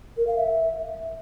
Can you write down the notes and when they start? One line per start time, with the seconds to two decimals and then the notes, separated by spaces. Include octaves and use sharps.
0.17 A#4
0.27 F5
0.37 E5